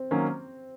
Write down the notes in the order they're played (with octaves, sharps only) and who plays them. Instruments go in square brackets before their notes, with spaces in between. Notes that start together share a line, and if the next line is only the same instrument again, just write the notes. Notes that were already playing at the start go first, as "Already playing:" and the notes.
Already playing: [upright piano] C4
[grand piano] D#3 F#3 A#3 C#4